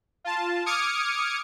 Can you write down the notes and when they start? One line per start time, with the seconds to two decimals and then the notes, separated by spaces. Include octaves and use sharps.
0.24 F4 A5
0.66 D6 D#6 F6 G#6 C#7